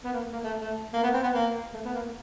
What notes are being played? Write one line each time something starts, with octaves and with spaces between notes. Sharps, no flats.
B3
A#3
A#3
A3
A3
A#3
B3
C4
B3
A#3
A3
B3
A#3